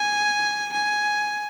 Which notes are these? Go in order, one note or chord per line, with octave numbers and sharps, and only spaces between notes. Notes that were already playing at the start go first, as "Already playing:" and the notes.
Already playing: G#5
G#5